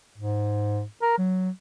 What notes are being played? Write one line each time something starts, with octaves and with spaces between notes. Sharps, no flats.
G#2
A#4
F#3